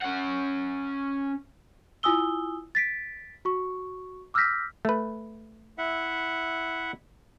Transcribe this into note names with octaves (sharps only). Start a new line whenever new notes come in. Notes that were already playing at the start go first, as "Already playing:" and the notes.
C#4 F#5
E4 F4 G#5 D#6 E6 G7
A6 B6 D7
F#4 C#6
D6 E6 F6 G6 A#6 B6
A3 B4
E4 E5 F#5